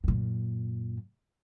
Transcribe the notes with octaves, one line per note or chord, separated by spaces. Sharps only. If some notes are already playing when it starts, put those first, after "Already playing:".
F#2 A#2